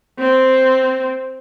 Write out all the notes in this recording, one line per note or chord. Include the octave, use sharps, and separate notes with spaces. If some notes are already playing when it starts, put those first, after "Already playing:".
C4